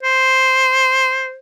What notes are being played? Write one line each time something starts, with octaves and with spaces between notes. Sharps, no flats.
C5